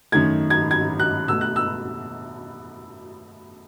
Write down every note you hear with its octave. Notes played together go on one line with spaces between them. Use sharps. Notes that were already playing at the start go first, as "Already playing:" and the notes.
F#2 D#3 A3 G#6
G#6
G#6
F#6
B2 A3 E6
F#6
E6